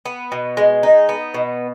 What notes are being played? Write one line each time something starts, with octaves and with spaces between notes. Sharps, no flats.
B3
B2
G#3
D#4
B3
B2